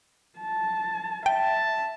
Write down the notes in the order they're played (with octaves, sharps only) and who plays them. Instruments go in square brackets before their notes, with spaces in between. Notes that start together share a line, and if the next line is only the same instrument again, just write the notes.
[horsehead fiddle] A5
[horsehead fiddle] E5 [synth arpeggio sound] G5 [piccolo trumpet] A5